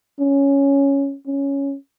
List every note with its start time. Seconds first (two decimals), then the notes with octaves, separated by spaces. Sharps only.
0.19 C#4
1.27 C#4